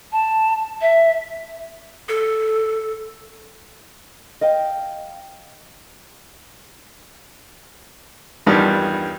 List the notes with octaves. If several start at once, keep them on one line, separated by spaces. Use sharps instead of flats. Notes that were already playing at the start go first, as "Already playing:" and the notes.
A5
E5
A4
D#5 F5 G5
E2 G2 D#3 F3 G3 B3